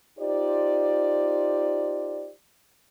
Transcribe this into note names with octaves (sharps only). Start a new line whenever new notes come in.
D#4 F4 G4 C5 D5